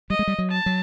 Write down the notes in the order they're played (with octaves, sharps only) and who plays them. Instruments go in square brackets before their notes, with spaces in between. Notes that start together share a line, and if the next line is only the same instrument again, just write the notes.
[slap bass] G3 [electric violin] D#5
[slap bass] G#3
G3
F#3
[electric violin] A5
[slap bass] F#3